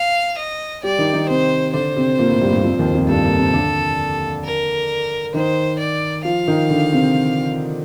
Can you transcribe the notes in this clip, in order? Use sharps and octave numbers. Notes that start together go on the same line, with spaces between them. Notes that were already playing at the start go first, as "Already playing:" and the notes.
Already playing: F5
D#5
G3 G4 D5
D#3 D#4
D#3 D#4
C3 C4 C5
D3 D4 C5
C3 C4
A#2 A#3
A2 A3
G2 G3
G2 G3
F2 F3
D#2 D#3
F2 F3
G2 G3 A4
A#2 A#3
C3 C4
D3 D4
A#4
D#3 D#4 C5
D5
F3 F4 F5
D#3 D#4
D3 D4
C3 C4